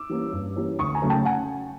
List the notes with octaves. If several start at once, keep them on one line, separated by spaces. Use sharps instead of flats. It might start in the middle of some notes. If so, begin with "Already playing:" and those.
Already playing: D6 E6
E3 G3 A#3 C#4
G2
E3 G3 A#3 C#4
D2 C#6 D#6
G#5 A#5
C#3 F#3 A3
G5 A5
F#5 G#5